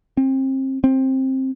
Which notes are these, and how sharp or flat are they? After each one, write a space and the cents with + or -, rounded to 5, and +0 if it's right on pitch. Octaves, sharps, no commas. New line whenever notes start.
C4 +30
C4 +15